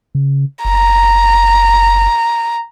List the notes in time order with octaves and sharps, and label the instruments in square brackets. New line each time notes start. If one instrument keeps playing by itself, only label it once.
[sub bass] C#3
[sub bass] F#1 [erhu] A#5